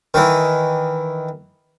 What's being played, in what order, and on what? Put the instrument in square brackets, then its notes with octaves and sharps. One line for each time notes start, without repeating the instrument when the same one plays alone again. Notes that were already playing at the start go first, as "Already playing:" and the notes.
[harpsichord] D#3 E3